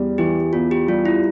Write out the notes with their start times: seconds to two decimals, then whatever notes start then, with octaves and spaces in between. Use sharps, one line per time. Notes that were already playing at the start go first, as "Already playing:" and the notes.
Already playing: E2 G3
0.18 E3 G4
0.53 E2 F4
0.71 G4
0.88 G3 F4
1.05 E4